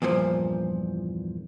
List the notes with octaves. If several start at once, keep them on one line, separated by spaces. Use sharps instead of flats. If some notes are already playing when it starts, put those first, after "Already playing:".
E2 G2 A#2 F3